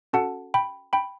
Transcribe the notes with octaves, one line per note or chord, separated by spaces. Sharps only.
C#4 F#4 A4 F#5 A5
G5 B5
G5 B5